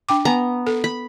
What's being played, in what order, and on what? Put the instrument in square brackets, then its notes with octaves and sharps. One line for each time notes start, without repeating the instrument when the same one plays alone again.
[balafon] D4 G5 D6
[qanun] B3 A#5 [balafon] G#5
[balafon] A4
[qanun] B5